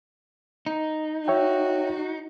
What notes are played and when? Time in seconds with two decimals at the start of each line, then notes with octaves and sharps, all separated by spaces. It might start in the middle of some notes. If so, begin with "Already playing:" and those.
0.66 D#4
1.28 F#4 C#5 E5 G5